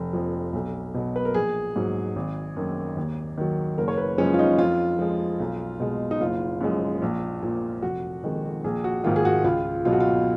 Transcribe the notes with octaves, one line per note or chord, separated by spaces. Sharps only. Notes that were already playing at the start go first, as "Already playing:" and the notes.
Already playing: F1
F2 F3
B1
B2 F#3
B4
A#4
A#1 G#4
G#2 F#3
G#1
F#2 D#3
D#2
D#3 F#3
F#1 A#4
C#5
B4
F#2 F3 G#3 C#4
F4
D#4
F2 F4
F3 G#3
B1
B2 G#3
D#4
F#1 F4
F#2 F3 G#3
A#1
A#2 F3
F1 F#4
F2 D#3 G#3
A#1 G#4
F#4
G#2 D#3 F4
G#4
F#4
C#2 F4
B2 F#3 F4
F#4
F4